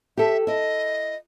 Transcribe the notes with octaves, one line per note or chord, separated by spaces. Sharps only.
G4 A4 E5
E4 D#5 E5